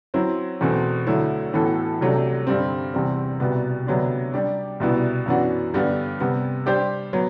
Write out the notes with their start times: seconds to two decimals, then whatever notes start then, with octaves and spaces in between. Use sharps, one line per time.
0.14 F#3 C4 E4
0.61 E2 B2 A3 C4
1.07 D2 D3 F#3 A3 E4
1.54 A2 E3 B3 F#4 A4
2.01 C2 C3 F#3 A3 D4
2.47 G2 D3 G3 C4
2.94 E2 C3 G3 C4
3.40 C2 B2 G3 B3
3.86 D2 C3 F#3 B3 D4
4.34 G3 D4 G4 D5
4.80 C2 B2 G3 B3 E4
5.26 F#2 E3 B3 D4 F#4
5.74 G2 D3 G3 B3 D4
6.20 C3 G3 B3
6.66 G3 D4 G4 C5
7.13 F#3 B3